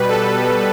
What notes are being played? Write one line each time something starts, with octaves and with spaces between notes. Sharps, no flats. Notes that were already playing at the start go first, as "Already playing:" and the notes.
Already playing: B2 G3 B4
A4